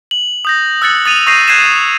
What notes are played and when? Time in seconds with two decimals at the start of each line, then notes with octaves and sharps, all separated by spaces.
0.11 F#7
0.45 D#6 G6 A#6
0.82 E6 F#6 A6 C#7
1.06 D#6 A6 D#7 F7
1.27 C#6 D#6 G6 A#6 C7 D#7
1.48 F#6 G#6 C7 D#7 E7